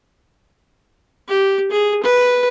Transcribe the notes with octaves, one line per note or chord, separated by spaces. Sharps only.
G4
G#4
B4